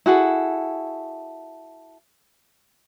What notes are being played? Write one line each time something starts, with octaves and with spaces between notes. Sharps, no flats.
E4 F#4 G#4 A4